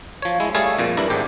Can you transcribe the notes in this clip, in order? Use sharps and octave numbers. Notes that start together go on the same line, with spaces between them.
F3 C#5
G#3 E4
G3 A3 G#4 A4 C#5 F5
F2 A#2
G2 D4 E4 A#5
G#1 G#2 G4